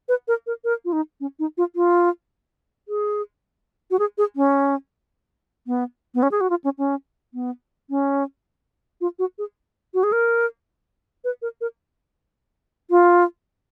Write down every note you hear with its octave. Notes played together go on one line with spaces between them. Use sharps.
B4
A#4
A#4
A#4
F4
D#4
C#4
D#4
F4
F4
G#4
F#4
G#4
G#4
C#4
B3
B3
C#4
G#4
F#4
F4
C#4
C#4
B3
C#4
F4
F#4
G#4
F#4
G#4
A#4
B4
A#4
A#4
F4